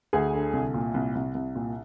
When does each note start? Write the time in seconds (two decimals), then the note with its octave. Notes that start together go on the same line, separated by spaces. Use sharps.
0.13 D2 G#4 G#5
0.34 D3
0.53 C2
0.74 A#2
0.94 C2
1.15 C2
1.35 C2
1.55 A#2